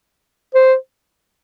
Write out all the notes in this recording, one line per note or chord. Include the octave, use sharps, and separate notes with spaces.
C5